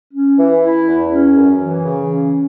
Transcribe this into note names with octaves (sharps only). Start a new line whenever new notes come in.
C#4
E3
E4
E2
C#4
F#2
E3
C#3
C#4